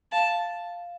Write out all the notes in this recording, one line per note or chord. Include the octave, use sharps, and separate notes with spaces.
F5 A5